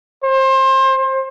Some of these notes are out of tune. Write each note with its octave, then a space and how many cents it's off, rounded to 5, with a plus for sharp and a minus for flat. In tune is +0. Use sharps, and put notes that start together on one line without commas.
C5 +25